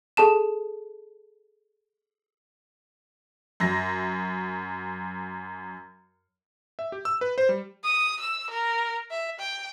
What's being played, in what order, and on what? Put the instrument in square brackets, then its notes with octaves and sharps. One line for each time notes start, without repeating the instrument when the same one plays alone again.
[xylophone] G#4 A4 A5 E7
[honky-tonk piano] F#2 A#6
[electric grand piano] E5
G4
E6
B4
C5
G3
[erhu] D#6
E6
A#4
E5
G5